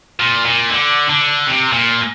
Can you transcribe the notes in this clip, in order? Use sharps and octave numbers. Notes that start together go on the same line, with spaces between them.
A#2
A#2
D3
D3
C3
A#2